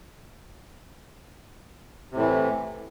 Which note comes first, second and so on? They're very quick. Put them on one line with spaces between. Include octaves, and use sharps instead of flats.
C3 A2 E3